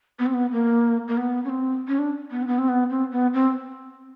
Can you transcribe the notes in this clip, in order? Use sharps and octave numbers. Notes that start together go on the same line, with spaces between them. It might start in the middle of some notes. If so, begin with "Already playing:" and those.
B3
C4
B3
A#3
A#3
B3
C#4
C4
C#4
D4
B3
C4
B3
C4
B3
C4
B3
C4